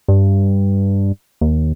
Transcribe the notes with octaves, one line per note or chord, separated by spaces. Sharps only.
G2
D#2